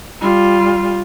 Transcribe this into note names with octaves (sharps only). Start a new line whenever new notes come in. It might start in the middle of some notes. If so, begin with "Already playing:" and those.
G3 F4